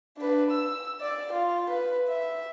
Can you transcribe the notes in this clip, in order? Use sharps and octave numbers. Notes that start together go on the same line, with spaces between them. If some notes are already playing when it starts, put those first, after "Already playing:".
D4 B4
E6
D5
F4
B4
E5